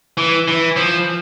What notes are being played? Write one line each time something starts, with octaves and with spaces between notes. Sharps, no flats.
E3
E3
F3